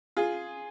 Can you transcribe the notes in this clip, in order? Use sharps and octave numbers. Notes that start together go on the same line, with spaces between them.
F4 G#4